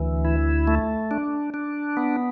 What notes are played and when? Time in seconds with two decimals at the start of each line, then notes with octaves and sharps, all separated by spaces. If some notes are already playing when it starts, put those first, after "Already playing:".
Already playing: D2 E3
0.25 E4
0.67 A3
1.11 D4
1.54 D4
1.97 B3